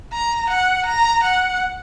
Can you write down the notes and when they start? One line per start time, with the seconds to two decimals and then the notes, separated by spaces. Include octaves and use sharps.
0.13 A#5
0.50 F#5
0.86 A#5
1.24 F#5